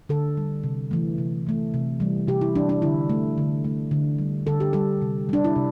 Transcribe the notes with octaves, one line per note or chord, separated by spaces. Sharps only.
D3 A4
G3
C3
E3 A3
C3
E3 A3
C3
E3 G3
C3 G4
E4
E3 G3 D4
D4
D3 E4
A3
D3
A3
D3
G3
D3 A4
G4
G3 A4
C3
G3 D4
E4
C3